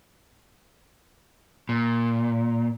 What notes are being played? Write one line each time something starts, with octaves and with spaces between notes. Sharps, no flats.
A#2